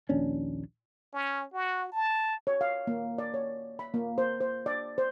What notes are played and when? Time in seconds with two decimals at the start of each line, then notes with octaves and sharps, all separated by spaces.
0.09 A#1 D#2 C#4 D4
1.14 C#4
1.53 F#4
1.92 A5
2.47 C#5
2.61 F5
2.87 A#3
3.18 D5
3.34 C#5
3.79 B5
3.94 A#3
4.18 C5
4.41 C5
4.66 D5
4.98 C5